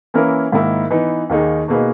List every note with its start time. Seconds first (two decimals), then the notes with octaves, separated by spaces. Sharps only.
0.14 E3 A#3 C#4 E4 A#4
0.52 G#2 D#3 A#3 E4
0.90 E3 B3 D#4
1.30 D#2 D#3 A#3 D#4 G#4
1.68 B2 A#3 D#4 G#4 B4